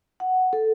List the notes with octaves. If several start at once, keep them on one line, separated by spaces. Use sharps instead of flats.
F#5
A4